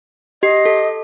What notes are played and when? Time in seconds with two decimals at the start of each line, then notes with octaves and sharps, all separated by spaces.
0.43 G4 D#5 C7
0.65 A4